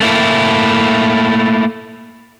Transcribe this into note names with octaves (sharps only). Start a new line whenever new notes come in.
A3 A#3 E4